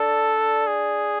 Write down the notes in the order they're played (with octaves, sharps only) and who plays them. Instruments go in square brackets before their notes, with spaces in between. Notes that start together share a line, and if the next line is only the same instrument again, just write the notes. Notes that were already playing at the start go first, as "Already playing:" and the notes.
Already playing: [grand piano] D4 [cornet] A4
[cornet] G#4